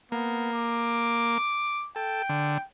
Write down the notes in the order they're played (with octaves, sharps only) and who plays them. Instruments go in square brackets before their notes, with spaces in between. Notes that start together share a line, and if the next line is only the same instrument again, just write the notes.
[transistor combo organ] A#3 [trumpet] B3
[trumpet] D6
[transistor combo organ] A4 [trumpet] G5
[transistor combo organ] D3